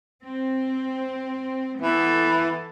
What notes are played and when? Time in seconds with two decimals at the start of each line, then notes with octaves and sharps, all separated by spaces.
0.23 C4
1.82 E3 B3 A4